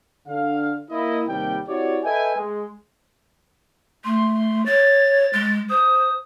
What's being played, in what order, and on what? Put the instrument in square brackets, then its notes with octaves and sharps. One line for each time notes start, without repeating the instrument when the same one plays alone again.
[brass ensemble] D3 F5
A#3 E4 D#5
D#2 C3 G3 G5
C4 E4 F#4 G4 C#5 D5
A4 B4 D#5 E5 G5 G#5
G#3
[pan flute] A3 [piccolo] C6
[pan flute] C#5 [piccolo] A6
[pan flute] G#3
[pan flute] C5 [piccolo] D#6